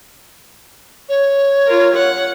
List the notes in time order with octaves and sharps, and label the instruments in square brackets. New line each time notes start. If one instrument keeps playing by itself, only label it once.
[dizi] C#5
[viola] F4 A#4
F#5